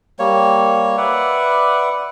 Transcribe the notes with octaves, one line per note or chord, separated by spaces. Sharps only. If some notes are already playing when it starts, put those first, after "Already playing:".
G3 A#3 C#5
B4 D5 E5 F#5